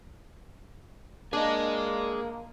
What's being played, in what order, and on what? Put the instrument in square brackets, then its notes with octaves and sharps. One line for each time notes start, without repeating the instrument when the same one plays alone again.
[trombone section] A#3 [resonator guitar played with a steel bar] D4 [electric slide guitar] G#4 D#5